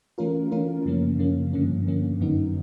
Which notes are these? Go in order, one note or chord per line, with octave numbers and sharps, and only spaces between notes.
E3 A3 C#4 F4 A#4
E3 A3 C#4 F4 A#4
F#2 C#3 F3 A#3 C#4
F#2 C#3 F3 A#3 C#4
G2 D3 F3 A#3 C#4
G2 D3 F3 A#3 C#4
F#2 D3 F#3 B3 D#4